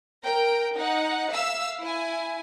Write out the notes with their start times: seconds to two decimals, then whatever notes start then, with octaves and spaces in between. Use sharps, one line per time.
0.23 A#4 G5
0.75 D#4 F#5
1.32 E5 F5 E6
1.81 E4 G#5